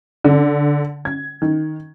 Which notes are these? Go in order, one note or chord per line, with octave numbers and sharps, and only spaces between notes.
D3
G#6
D#3